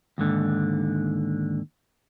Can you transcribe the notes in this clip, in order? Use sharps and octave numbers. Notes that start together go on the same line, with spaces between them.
D#2 G#2 D3